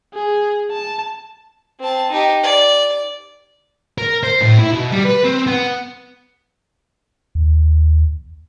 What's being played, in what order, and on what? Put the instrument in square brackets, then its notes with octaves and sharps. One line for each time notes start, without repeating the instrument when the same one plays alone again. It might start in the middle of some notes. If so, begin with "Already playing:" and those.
[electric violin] G#4
A5
[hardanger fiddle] C4 A5
D#4 G4
D5
[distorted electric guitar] A#4
C5
A2
E4
B2
G3
B4
C4
B3
[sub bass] D#2